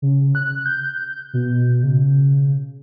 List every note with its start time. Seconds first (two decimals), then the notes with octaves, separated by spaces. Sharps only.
0.02 C#3
0.35 F#6
0.65 G6
1.34 B2
1.83 C#3